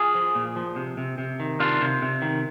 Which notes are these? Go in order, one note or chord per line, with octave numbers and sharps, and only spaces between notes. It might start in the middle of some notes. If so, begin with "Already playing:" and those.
Already playing: F4 G#4
F3
A#2
F3
C3
C3
C3
D#3
C3 D4 F4
C3
C3
D#3